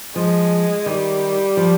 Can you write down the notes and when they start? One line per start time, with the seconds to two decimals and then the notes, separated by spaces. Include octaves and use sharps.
0.16 F3 G#3
0.86 D#3 G3
1.57 F3